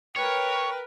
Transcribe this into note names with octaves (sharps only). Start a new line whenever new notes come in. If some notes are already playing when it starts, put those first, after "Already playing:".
A#4 B4 C#5 G5